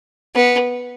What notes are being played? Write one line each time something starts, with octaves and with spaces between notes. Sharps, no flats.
B3